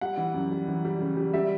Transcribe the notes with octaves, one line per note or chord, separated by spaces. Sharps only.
G3 F#5
E3
F#2
G3
E3
G3
C#3
G3
G3 E5